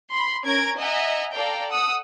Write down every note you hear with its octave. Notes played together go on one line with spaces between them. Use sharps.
B5 C6
C#4 A#4 A#5 G#6 D7
D#5 E5 F#5 G#5 A#5
A4 D5 F5 G5 A#5
F#5 D#6 E6